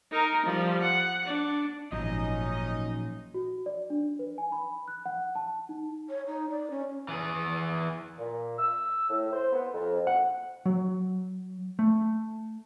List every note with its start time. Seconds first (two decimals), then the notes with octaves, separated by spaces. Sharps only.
0.12 D#4 A#4
0.46 F3 G3
0.81 F#5
1.26 D4
1.92 G#1 A#2 F3 F#3 C#4 D#4 D#5
3.34 F#4
3.66 D5
3.90 D4
4.19 B4
4.38 G#5
4.52 B5
4.88 F#6
5.06 F#5
5.35 A5
5.69 D#4
6.09 C#5
6.27 D#4
6.50 D5
6.70 C#4
7.08 E3 G#4
8.19 A#2
8.58 E6
9.10 A2
9.33 C5
9.53 B3
9.74 F2
10.07 F#5
10.66 F#3
11.79 A3